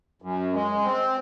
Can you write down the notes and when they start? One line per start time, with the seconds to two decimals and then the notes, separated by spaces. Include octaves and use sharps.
0.22 F#2
0.53 G#3
0.83 C4